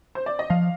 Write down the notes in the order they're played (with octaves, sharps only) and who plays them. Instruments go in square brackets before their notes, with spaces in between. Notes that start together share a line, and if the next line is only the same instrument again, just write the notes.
[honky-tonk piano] C5
D5
D#5
[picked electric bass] F3 [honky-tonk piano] F5